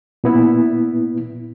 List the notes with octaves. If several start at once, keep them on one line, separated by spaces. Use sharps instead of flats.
A#2 B3 E4